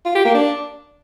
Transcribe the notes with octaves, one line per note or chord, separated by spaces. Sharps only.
F4
G4
A#3
D4